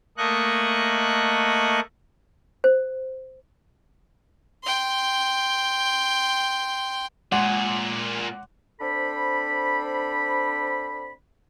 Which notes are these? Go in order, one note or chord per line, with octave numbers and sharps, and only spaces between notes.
A3 A#3 D#5 C#6 F#6
C5
G5 C6
A#2 G#3 G#4 F#5 C6 D6
C4 D4 A4 C5 B5